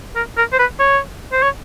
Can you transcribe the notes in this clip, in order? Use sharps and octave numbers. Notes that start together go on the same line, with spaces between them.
A#4
A#4
C5
B4
C#5
C5
C#5